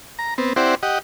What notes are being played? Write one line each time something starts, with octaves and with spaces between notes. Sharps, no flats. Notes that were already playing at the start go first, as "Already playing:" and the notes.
A#5
B3 C4
C4 E4 G4 C5 D5 F#5
G4 D#5 F#5